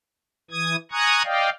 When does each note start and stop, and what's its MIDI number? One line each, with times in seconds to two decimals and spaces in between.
0.51 0.76 52
0.51 0.76 87
0.51 0.76 92
0.92 1.22 80
0.92 1.22 82
0.92 1.22 85
0.92 1.22 87
0.92 1.22 90
0.92 1.22 92
1.25 1.50 74
1.25 1.50 75
1.25 1.50 77
1.25 1.50 79